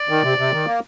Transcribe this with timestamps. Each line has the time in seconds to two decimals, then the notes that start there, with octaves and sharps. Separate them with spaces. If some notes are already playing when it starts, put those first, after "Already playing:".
Already playing: D5
0.09 D#3
0.23 C3
0.38 C3
0.52 D#3
0.66 A#3